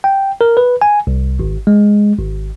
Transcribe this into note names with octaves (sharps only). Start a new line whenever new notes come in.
G5
A#4
B4
G#5
C2
G#1
G#3
G#1